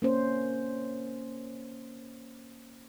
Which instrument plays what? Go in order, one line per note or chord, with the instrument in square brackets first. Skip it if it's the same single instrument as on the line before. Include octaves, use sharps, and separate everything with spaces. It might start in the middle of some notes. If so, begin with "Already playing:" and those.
[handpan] A#3 C#4 C5